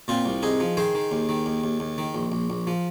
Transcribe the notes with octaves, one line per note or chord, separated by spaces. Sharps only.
A#2 C4 F4
C2
C2 D#4 G#4
F3
D#3 G#4 C5
D#3
D#2
D#3
D#2
D#2
D#2
D#3
A#1
A#1
A#1
F3